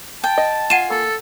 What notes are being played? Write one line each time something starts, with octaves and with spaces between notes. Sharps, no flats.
G5 A5
D#5
F4 F#5 G#5 D#7 E7
A#3 A4